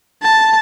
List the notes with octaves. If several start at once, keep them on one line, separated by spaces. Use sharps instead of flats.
A5